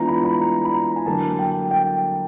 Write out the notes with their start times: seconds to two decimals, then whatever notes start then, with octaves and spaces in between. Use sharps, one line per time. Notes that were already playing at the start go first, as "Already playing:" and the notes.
Already playing: E3 G#3 B3 D4 F4 A#5
0.08 B5
0.25 B5
0.41 A#5
0.65 B5
0.74 A#5
0.96 G#5
1.06 D3 F#3 A#3 A5
1.39 G5
1.71 G5